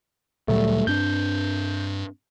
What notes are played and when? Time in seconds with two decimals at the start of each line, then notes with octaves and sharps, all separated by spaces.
0.48 D2 A#2 F#3 G3 A3
0.87 G2 C4 D4 G6